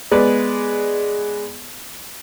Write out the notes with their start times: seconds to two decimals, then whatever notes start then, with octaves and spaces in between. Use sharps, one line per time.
0.12 G#3 B3 B4 D5